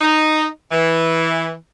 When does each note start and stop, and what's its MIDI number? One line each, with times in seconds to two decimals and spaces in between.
0.01 0.46 63
0.71 1.53 52